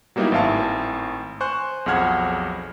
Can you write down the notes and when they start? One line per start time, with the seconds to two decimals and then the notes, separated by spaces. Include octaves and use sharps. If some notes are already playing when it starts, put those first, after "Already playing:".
0.16 F#3 G3 A#3 B3 D#4 E4
0.32 G#1 A2 E5 F5 A5
1.41 C5 G#5 C#6 F#6
1.86 B1 F2 G#4 F#5 F6 G#6